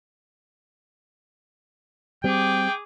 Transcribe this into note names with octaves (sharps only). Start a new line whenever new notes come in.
G3 C4 G#4 G5 D6